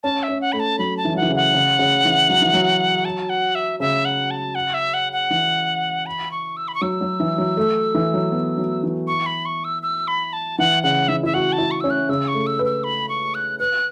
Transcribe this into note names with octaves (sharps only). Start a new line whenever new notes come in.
C#4 A5
E5
C#4
F#5
A3 B5
A5
F#3 B5
A5
E3
F#3
F#5
E3
C#3
F#5
C#3
C#3
E3
F#3
E3
F#3
A5
F#5
E5
C#3 E5
F#5
A5
F#5
E5
F#5
F#5
E3
B5
C#6
E6
B5
C#6
F#3 E6
F#3
E3
F#3
A3
E3
F#3
B3
F#3
E3
C#6
B5
C#6
E6
E6
B5
A5
E3 F#5
C#3 F#5
E3 E5
E4 E5
F#4 F#5
A5
E4
C#6
C#4 E6
F#6
C#3 E6
C#6
A3
E6
B4
E6
B5
C#6
F#6
B4 F#6